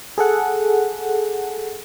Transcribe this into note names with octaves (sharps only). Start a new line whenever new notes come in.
G#4 A4 F#5